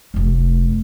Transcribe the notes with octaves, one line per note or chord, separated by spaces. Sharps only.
F1 D2